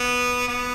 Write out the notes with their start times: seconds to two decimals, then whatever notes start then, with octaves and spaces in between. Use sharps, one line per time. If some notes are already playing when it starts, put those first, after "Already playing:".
Already playing: B3
0.48 B3